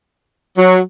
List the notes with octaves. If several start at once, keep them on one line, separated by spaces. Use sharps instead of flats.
F#3